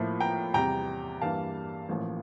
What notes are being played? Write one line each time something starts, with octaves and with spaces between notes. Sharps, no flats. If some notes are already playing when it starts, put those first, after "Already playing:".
Already playing: A2 F3 A#3 E4
G5 A#5
E2 C3 G3 G5 A#5
G2 E3 G3 A#3 F5 A5
A1 A2 F3 A#3